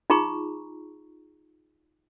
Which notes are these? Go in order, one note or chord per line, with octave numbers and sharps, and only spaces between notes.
D#4 F4 G#4 A#5 C#6